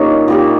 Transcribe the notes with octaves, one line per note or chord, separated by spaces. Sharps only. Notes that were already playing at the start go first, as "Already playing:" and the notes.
Already playing: A#2 G3 A#3 C#4 D#4
A#2 G3 A#3